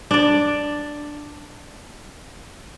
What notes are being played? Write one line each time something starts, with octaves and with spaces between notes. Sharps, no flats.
D4 D5